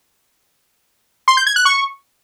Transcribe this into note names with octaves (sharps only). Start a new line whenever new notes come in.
C6
G6
G#6
F#6
C#6